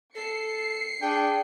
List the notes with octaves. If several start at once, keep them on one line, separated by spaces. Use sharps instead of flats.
A4 C7 C#7
D4 G#4 G5